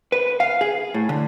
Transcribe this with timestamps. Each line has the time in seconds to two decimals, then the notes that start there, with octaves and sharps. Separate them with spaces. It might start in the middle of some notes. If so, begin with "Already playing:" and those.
0.12 B4
0.40 F5
0.61 G#4
0.94 A2
1.09 D3